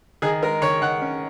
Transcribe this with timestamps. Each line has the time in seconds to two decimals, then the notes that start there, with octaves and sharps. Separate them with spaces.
0.22 D#3 G#4
0.42 G#3 A#4
0.62 D#3 C#5
0.82 D#3 F#5
1.02 C#4